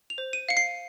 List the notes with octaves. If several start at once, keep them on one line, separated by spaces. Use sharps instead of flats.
F7
C5
D#7
F5 C#7
C7